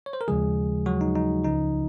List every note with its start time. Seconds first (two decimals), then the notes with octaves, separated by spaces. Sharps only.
0.06 C#5
0.13 C5
0.21 A#4
0.28 D#2 C#3 F3 G#3 G#4
0.86 F#3 F#4
1.01 D#4
1.16 D#4
1.43 C#2 C#3 F3 D#4